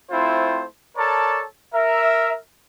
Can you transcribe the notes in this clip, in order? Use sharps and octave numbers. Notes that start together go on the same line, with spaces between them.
A3 C4 E4 F4 C5
A4 A#4 C#5 D5 A5
A#4 E5